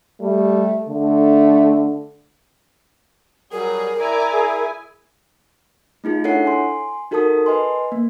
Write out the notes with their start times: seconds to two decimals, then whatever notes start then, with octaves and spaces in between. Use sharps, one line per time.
0.21 G3 A3
0.89 D3 A3
3.52 F#3 G3 G#4 A#4
3.99 E4 D5 G#5 A#5
4.33 G#4
6.04 A3 D#4 F4 G#4
6.24 D4 E4 A4 C#5 F#5 C7
6.46 G#5 C6
7.11 D#4 F#4 A4 A#4 A5 D#6
7.46 B4 D#5 G#5 C6
7.92 A#3